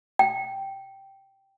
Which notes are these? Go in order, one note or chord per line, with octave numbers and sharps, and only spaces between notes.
G5